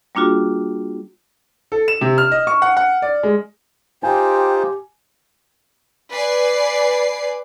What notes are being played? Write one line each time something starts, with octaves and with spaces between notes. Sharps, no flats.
G3 A#3 D4 F4 F#4 G#4
A4
E7
C3
F6
D#5
C#6
F#5
F#5
D5
G#3
D#4 F4 G4 C5 G5 G#5
B4 D5 G#5 C7